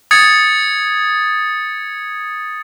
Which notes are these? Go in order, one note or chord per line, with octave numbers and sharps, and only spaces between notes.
D#6 G#6 A6 C#7